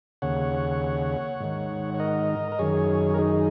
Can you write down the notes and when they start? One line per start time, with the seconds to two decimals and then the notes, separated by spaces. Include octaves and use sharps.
0.22 D#2 C#3 C#5 F#5
1.40 G#2 D#3
1.94 C#5
2.00 A#4 D#5
2.52 A#4
2.59 F#2 D#3 G#4 C#5
3.14 A#4
3.18 D#4 G#4